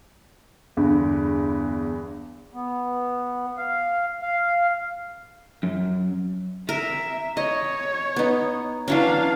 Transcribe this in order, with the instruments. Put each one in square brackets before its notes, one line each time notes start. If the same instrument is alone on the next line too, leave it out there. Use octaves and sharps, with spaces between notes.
[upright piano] E2 G2 D3
[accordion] B3
F5
F5
[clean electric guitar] F#2
[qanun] A#4 [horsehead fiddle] E5
[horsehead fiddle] C#5 [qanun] D#5
[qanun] B3 D#4
[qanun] E3 F#3 C#4 [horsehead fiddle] D4 F5